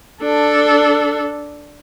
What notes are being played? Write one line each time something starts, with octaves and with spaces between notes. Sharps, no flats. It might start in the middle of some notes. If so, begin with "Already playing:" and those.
D4 A4